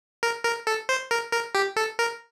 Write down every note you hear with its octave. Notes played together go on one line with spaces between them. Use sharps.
A#4
A#4
A4
C5
A#4
A#4
G4
A4
A#4